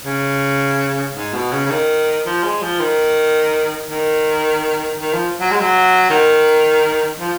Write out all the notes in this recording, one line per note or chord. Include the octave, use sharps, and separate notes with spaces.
C#3
G#2
B2
C#3
C#3
D#3
F3
G#3
F3
D#3
D#3
D#3
F3
F#3
G#3
F#3
D#3
F3